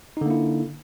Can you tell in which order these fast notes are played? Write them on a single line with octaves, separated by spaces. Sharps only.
D#4 D3 A#3 E4